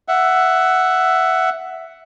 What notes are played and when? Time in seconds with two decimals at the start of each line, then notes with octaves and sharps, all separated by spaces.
0.08 E5 F#5